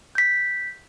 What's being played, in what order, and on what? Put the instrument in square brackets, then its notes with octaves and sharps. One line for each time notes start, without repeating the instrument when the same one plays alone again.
[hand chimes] G6 B6